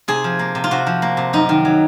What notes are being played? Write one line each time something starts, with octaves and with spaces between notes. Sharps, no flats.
C3 G#4
F3
A#3
C3
F4
C3 F#4
F3
A#3
C3
F#2 D#4
D#3
F#3